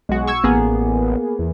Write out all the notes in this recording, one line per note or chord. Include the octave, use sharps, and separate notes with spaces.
B1 G#3 F#4
C#6 E6 G#6
A1 A#3 B3 G#4
E2